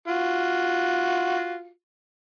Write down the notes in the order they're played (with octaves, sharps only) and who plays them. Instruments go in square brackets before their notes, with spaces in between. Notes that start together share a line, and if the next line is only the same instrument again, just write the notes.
[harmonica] F4 F#4